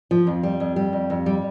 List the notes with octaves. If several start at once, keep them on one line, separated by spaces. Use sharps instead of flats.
F3
F2
G3
F2
G3
F2
F2
G3